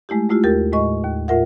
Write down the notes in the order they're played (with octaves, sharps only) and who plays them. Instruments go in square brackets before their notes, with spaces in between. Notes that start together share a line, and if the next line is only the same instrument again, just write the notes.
[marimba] G#3 A3 E4 G4
G#3 A3 E4 F4 G4
D#2 G4 A#4 A6
A2 G#3 D#5 C#6
D#2
A2 F4 A#4 E5 F#5